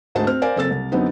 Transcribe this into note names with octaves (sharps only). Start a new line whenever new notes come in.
D2 G#2 A3 G#4 C5 A5
C4 F6
A#4 C5 D5 F5 G#5
F#1 C4 A4 E6 A6
C2
F#2 D3 F#3 B3 C4 D#4